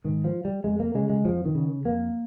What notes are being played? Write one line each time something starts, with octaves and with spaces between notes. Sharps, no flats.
G#2 D#3
F3
G3
F2 G#3
A#3
C#3 G#3
G#3
F2 F3
D#3
C#3
F2 A#3